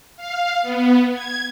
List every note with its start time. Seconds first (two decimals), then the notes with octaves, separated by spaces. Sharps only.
0.17 F5
0.62 B3
1.13 G#6